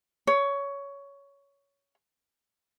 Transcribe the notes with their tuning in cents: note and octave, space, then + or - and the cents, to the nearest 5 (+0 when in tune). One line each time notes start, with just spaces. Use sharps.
C#5 +15